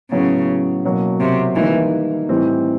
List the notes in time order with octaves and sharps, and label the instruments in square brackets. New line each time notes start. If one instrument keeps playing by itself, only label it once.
[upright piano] A2 F#3 B3 [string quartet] C#3
[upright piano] B2 F#3 A#3
[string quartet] C3
[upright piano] D#3 G3 A#3 D#4 [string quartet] E3
[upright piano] A2 E3 G3 C4 D#4